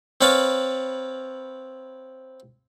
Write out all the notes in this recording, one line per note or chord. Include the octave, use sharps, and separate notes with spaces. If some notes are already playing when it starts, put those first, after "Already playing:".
C4 B4 C#5 F5 A5 B5